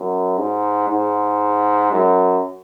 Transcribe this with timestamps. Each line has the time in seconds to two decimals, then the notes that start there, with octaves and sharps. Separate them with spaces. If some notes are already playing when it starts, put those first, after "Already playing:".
Already playing: F#2
0.38 G#2
0.89 G#2
1.92 F#2